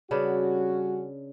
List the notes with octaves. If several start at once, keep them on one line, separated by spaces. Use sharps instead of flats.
C#3 G3 C#4 D4 F#4 B4